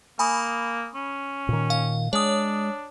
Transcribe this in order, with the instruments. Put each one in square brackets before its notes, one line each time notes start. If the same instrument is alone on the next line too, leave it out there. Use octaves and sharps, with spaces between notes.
[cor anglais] A#3 [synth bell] G#5 B5 D#6
[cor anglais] C#4
[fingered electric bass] A#2 D#3
[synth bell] F5
[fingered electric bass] G#3 [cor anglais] D4 [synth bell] C#5 D#6